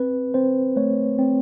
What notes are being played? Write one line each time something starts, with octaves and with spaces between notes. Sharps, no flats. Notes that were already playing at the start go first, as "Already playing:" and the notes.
Already playing: C4 B4
C4 C5
A3 C#5
C4